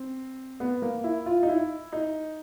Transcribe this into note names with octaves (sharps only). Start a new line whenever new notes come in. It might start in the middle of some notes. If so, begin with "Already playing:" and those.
Already playing: C4
B3
A#3
E4
F4
D#4
E4
D#4